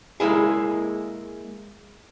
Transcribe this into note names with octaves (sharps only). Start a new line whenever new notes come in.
G#3 A#3 E4 G#4